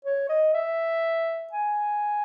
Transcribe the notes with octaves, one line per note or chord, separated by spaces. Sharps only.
C#5
D#5
E5
G#5